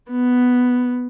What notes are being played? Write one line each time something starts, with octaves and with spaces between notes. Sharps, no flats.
B3